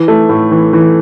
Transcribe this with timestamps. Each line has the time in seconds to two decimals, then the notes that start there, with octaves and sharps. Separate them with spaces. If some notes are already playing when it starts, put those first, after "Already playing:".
Already playing: E3
0.08 A3
0.29 A2
0.51 E3
0.73 E3